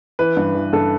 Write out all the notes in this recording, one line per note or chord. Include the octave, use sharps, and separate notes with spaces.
E3 B4
G2
E3
G2 A4